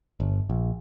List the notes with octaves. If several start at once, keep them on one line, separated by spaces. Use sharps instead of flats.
G1
A#1